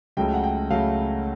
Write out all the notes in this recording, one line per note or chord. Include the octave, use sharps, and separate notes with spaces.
C#2 C#3 F#3 A3 G5
F#5
G5
C#2 C#3 F#3 A3 F5